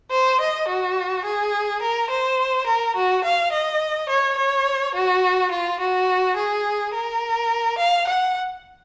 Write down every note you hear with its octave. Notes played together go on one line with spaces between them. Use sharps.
C5
D#5
F#4
G#4
A#4
C5
A#4
F#4
F5
D#5
C#5
C#5
F#4
F4
F#4
G#4
A#4
F5
F#5